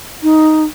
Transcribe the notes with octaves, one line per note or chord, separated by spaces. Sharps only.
D#4